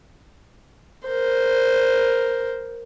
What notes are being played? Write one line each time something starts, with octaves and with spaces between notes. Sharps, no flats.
A#4 C5